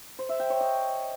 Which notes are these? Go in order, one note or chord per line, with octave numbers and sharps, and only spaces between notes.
C5
E5
G5
C#5
D#5